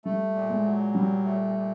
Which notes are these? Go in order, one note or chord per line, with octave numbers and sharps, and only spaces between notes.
G3 A3
A#2
G#3
F#3
A#2 G3
A3
A#2